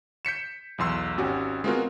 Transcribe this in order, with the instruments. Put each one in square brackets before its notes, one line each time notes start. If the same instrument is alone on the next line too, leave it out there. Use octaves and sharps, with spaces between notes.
[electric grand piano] G6 B6 C#7 E7
B1 E2 C6 E6
G#1 C#4 F#4 G4
G#3 B3 C4 F4 F#4 A#4